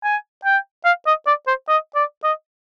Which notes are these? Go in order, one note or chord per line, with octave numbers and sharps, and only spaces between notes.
G#5
G5
F5
D#5
D5
C5
D#5
D5
D#5